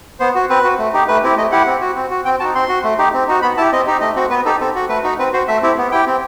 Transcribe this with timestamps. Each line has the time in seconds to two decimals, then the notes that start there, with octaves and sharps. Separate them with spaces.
0.20 B3 C5
0.35 F#4
0.49 C4 B4
0.64 F#4
0.79 A3
0.93 D#4 G4
1.08 A3 B4
1.23 C4 E4 G4
1.37 A3 D#5
1.52 E4 G4 F#5
1.66 C4
1.81 F#4
1.96 C4
2.11 F#4
2.25 C4 G5
2.40 D#4 F#4 A5
2.55 C4 C6
2.69 F#4
2.84 A3
2.98 D#4 G4
3.14 C4
3.28 D#4 F#4
3.42 B3 B5
3.57 E4 G4 A5
3.72 C4 D#5
3.87 D#4 G4
4.01 A3 D#5
4.16 C4 F#4
4.30 B3 B4
4.45 D#4 G4 A4
4.60 C4 A4
4.75 F#4
4.89 A3 B4
5.04 D#4 F#4
5.19 C4 B4
5.33 F#4 C5
5.48 A3 E5
5.62 C4 E4 G4
5.78 B3
5.91 E4 G4 G5
6.07 C4